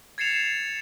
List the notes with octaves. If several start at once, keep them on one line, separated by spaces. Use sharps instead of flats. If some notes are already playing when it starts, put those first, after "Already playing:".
G#6 A6 C7 C#7 E7 F7